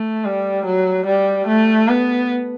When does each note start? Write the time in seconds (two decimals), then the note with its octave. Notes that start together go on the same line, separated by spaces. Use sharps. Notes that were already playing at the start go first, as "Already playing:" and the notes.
Already playing: A3
0.25 G3
0.66 F#3
1.07 G3
1.47 A3
1.88 B3